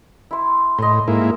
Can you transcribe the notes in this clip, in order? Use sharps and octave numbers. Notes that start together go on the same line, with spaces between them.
E4 C6
A2 D#5 C6
G#2 A#3 E4